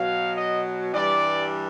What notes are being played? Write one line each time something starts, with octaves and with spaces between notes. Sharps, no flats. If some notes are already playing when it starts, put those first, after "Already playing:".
Already playing: B2 F#3 F5
D#5
G2 E3 G3 D5